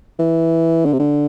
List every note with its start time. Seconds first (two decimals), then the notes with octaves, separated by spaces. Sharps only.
0.19 E3
0.86 D3
0.93 C3
0.99 D3